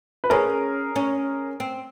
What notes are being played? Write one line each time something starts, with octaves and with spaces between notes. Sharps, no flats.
B4
C#4 G#4 A#4
C#4
C4